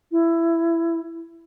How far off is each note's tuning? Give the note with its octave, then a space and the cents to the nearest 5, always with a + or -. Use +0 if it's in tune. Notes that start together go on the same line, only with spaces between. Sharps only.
E4 +15